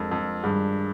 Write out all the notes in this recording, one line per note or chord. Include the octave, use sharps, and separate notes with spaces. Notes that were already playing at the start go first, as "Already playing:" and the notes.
Already playing: F2 G#3 D4 F4 A#4
F2
G2 D#3 G3 D4 G#4